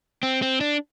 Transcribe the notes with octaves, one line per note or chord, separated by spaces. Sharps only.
C4
C4
D4